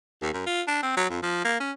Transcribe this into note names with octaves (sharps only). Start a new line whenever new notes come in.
D#2
F#2
F4
D4
C4
F#3
F2
F3
A#3
C#4